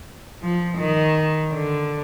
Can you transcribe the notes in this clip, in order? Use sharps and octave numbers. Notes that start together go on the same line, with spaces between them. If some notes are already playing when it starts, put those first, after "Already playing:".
F3
D#3
D3